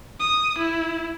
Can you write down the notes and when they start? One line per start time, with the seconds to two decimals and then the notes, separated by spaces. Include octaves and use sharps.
0.20 D#6
0.58 E4